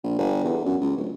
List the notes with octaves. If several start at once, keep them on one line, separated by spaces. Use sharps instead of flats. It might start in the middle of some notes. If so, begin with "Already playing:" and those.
A#1
G1
E2
F#2
C#2
D1